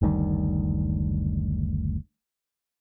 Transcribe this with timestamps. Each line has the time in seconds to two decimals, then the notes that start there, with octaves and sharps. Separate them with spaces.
0.02 F#1 D2 D#3 G3